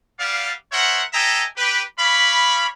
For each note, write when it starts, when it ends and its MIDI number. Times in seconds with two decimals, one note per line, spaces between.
0.19 0.51 55
0.19 0.51 59
0.19 0.51 74
0.19 0.51 77
0.72 1.03 70
0.72 1.03 72
0.72 1.03 73
0.72 1.03 76
0.72 1.03 78
1.13 1.44 69
1.13 1.44 75
1.13 1.44 76
1.13 1.44 79
1.13 1.44 80
1.13 1.44 82
1.57 1.82 67
1.57 1.82 71
1.99 2.67 73
1.99 2.67 74
1.99 2.67 77
1.99 2.67 83